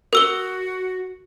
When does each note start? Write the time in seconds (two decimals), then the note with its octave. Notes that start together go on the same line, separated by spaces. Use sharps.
0.13 F#4 A#4 E6 G7